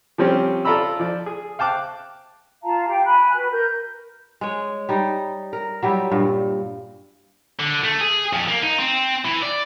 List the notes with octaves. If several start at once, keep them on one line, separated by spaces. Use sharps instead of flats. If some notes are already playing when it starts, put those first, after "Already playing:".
F3 G3 C4 C#4 G4
F4 A4 D5 A#5 B5 E6
F3 D5
G#4
F5 G5 A5 D6 F#6
F4 F5 A5 A#5
G4 F5 G5
G#5 B5 F#6
F#4 B4
A#4 G6
G#3 C#5
G3 D#4
A#4
F#3 G3 E4 G4
G2 A#2
D3
A3
G#4
F2
A#3
D#4
C4
E3
D5